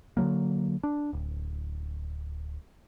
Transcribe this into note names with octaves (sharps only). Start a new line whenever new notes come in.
D3 F3 F#3 A#3
D4
D1